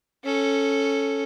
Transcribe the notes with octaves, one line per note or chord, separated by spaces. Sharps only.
C#4 A4